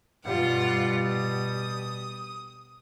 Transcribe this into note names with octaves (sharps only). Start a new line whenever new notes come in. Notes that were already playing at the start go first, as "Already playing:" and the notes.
G2 B2 G3 F4 F#5
D#6